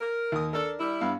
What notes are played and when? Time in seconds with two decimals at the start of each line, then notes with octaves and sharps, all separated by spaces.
0.01 A#4
0.32 D#2 D#6
0.53 D4 A4 A#4
0.79 G3 E4
1.01 G2 B3 F5